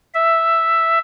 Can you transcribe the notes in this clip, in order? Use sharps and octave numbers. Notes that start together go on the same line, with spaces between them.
E5